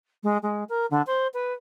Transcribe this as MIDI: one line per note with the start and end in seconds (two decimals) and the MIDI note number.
0.23 0.37 56
0.42 0.64 56
0.69 0.86 70
0.90 1.02 50
1.06 1.27 72
1.33 1.53 71